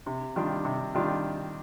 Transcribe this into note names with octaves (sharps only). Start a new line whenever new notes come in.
C3
D#3 G3 D4 F4
C3
D#3 G3 D4 F4